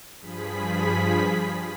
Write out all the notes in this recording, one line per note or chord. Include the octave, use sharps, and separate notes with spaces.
G2 F3 G#4 B5 B6